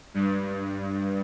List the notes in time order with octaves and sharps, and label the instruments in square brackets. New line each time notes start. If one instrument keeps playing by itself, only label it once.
[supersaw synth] G2